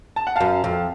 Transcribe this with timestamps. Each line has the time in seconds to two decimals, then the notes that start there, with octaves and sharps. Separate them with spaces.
0.16 A5
0.27 F#5
0.36 F#2 F5 A5
0.64 F2